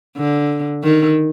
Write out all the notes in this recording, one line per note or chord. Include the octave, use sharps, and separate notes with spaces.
D3
D#3